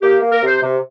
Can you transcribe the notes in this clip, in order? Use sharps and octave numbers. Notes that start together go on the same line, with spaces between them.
A#3 G4
A#3
A#4
C3
C5
C3